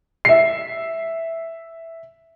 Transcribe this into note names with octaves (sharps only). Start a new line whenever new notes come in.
E5 C7